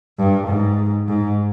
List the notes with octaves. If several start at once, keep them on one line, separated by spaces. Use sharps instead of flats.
G2
G#2
G#2